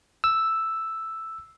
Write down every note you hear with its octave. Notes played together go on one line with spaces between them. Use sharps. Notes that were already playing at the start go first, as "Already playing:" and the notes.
E6